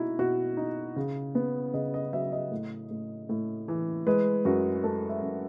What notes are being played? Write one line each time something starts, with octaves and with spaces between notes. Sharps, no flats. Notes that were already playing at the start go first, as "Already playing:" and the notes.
Already playing: B2 D#4 E4 F#4
B2 F#4
D#4
C#3
B3
C#3 D#5
D#5
F#3 E5
D#5
A2
A2
A2
E3
G#3 B4
F#2 F#4
G#3 A4
E5
F#2